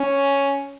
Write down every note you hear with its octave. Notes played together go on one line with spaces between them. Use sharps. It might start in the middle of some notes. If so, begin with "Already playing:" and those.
Already playing: C#4